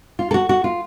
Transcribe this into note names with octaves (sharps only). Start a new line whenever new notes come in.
F4
A4
F#4
F#4
F4